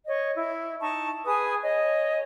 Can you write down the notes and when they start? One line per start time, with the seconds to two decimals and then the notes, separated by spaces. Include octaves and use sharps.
0.06 C#5 D#5
0.35 E4
0.81 D#4 A5 C#6
1.26 G#4 B4 G#5 D#6
1.62 C#5 D#5